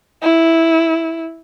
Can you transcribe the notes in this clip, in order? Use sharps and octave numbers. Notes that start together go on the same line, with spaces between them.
E4